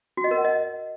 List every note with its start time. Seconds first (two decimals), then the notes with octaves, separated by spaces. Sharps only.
0.17 F#4
0.24 D#5
0.31 A#4
0.38 F#5
0.45 D#5